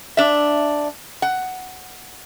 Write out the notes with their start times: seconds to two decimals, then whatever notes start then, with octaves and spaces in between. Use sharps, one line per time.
0.17 D4 E5
1.22 F#5